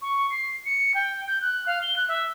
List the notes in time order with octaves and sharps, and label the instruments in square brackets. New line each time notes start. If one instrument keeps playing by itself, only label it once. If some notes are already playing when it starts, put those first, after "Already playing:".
[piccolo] C#6
C7
C#7
G5
G6
F#6
F5
G7
F#6
E5